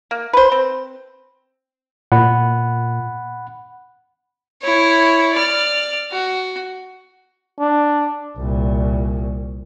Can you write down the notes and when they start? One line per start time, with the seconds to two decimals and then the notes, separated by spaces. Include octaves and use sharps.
0.11 A#3
0.33 B4 C5
0.52 C4
2.12 A#2 F#5 B5
4.63 E4 C#5
5.34 D5 F6
6.12 F#4
7.60 D4
8.37 C2 A#2